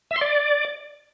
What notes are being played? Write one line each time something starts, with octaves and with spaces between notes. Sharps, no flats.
E5
C6
D5